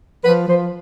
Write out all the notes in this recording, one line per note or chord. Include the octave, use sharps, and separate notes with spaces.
F3 B4
F3 C5